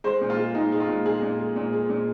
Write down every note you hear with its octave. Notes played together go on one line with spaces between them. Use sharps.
G#3 C5
A#2
F4
G#3
A#2 D#4
G#3
F4
A#2
G#3 G#4
A#2
G#3
A#2
G#3
A#2